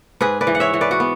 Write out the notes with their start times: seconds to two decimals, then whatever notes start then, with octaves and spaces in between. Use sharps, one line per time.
0.21 G#2 G#4 B4
0.41 B4 D5
0.47 E3
0.55 F#5
0.60 C#5 E5
0.74 E3
0.81 B4 D5
0.91 F#4
1.00 B3